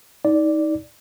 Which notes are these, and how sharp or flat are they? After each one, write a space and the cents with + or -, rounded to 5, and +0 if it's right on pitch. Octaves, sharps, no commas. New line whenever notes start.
D#4 +25 D5 -5